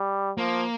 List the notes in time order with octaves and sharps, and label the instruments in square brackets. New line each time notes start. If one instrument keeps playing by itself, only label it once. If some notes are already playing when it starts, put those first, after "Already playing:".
Already playing: [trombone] G3
[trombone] F3 [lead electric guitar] A#3